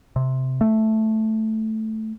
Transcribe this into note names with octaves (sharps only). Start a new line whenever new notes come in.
C3
A3